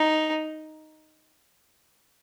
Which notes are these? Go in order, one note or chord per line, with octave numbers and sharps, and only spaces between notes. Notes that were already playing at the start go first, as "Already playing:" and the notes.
Already playing: D#4